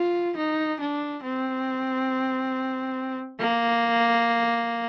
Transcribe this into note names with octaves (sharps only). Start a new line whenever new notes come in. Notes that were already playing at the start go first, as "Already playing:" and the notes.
Already playing: F4
D#4
D4
C4
A#3